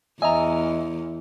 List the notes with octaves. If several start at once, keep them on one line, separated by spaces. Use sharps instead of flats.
E2 D#5 E5 G#5 A#5